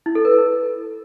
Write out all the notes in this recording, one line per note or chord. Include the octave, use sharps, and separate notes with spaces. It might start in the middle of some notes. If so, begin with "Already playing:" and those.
E4
A4
B4